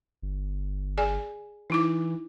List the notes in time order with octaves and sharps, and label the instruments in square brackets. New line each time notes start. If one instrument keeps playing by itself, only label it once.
[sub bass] G1
[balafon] G#4 D5 G#5
[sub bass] E3 [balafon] D#4 E4 D6